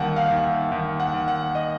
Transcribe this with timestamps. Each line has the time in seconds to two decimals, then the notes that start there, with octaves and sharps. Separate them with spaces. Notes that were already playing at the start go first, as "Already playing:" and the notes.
Already playing: D#2 D#3 G3 D#5 F#5 G5
0.16 F5
0.31 D#2
0.44 E5
0.72 D#2
1.00 F#5
1.14 D#2
1.28 F#5
1.55 D#5